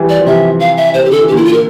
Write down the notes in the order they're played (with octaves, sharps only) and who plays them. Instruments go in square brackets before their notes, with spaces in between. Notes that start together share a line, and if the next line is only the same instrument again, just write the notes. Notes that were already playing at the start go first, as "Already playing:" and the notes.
Already playing: [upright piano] E3 G3
[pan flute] D5
[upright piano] F3
[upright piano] C3 E3 [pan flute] E5
[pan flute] F5
E5
[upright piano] C3 [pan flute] C5
[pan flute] G4
[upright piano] D3 [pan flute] A4
[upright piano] E3
[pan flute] G4
[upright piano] A#2 D3 [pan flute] E4
[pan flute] F4
A#4